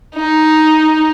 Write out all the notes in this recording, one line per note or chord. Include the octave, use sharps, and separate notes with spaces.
D#4